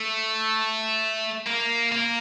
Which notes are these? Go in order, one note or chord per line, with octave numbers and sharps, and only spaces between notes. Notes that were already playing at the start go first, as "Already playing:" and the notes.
Already playing: A3
A#3
A#3